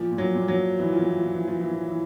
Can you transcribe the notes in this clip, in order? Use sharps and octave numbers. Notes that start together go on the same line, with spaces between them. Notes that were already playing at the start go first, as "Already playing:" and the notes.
Already playing: A#2 F3
A#2
F#3
A#2
F#3
A#2
A#2 E3
F3
A#2
E3
A#2 F3
E3
A#2 F3
E3
A#2 F3
E3